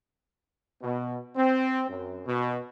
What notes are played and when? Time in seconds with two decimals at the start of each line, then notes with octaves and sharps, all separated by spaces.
0.82 B2
1.36 C4
1.88 F#2
2.26 B2